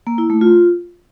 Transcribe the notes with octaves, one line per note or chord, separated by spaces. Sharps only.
A#3
E4
A3
F4